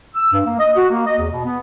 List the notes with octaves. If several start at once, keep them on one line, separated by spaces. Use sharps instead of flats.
E6
G2
A#3
D#5
F#4
A#3
D#5
E2
B2
B3